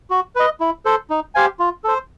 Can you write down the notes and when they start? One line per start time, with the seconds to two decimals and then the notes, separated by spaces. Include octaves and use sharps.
0.10 F#4
0.36 B4 D#5
0.60 E4
0.85 A4 C5
1.10 D#4
1.35 G4 C5 F5 G#5
1.59 F4
1.84 A4 C5